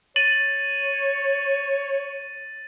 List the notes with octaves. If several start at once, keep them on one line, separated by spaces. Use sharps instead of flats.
C#5 A6 D#7 F#7